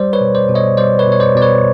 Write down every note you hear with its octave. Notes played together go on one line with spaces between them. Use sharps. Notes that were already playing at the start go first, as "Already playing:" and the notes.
Already playing: G3 C5 D5
B4 C#5
B2
C5 D5
B2
C#5 D#5
G3 C5 D5
B4 C#5
B2
C#5
C5 D5
B2 D5
B4 C#5